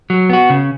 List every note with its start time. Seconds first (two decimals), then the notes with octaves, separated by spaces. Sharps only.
0.10 F#3
0.30 B3 F#4
0.50 C#3